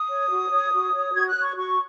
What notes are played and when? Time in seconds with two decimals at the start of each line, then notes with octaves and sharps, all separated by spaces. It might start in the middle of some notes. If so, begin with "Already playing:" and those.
Already playing: D#6
0.09 C#5
0.30 F#4
0.50 C#5
0.72 F#4
0.93 C#5
1.13 F#4 G#6
1.28 F#6
1.35 C#5
1.41 C#6
1.55 F#4 C#6